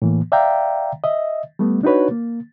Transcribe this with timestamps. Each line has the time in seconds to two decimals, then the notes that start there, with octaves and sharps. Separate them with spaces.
0.02 A2 E3 A#3
0.32 D5 E5 F5 G5 A#5
1.04 D#5 E5
1.59 G3 A3 B3
1.83 D4 D#4 F#4 B4 C#5
2.11 A#3